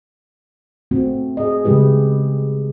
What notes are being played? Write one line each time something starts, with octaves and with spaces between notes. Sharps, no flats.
A3 C4 F#4
G#4 D#5
C#3 G#3 E4 G4 B4